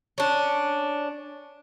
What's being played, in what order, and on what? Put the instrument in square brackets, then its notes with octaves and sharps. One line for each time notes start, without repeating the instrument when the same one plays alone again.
[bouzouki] C#4 D4